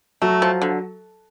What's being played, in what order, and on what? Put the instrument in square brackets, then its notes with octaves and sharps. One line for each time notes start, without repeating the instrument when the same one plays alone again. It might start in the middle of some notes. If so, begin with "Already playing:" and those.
[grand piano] F#3 F#4 [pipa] A3
[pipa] F3
D3